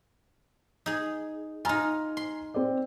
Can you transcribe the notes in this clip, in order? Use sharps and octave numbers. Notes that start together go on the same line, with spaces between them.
D#4 G#4
D#4 F4 G#5 A#5 F6
C6
C4 D5